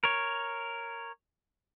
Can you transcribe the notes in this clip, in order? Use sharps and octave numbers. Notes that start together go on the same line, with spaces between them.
A#4 C#5